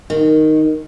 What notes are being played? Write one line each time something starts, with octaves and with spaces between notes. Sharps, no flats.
D#3